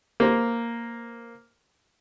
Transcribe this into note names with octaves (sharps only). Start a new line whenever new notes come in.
A#3 C5